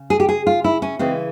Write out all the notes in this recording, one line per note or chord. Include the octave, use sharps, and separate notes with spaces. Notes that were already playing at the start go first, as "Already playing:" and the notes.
Already playing: C#3
G#4
G4
G#4
F4
E4
C#4
C#3 E3 G#3 C4